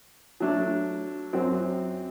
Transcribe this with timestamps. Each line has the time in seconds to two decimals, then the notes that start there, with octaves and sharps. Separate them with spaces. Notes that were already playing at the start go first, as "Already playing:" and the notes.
0.40 F#3 A3 D4
1.33 F#2 F#3 C4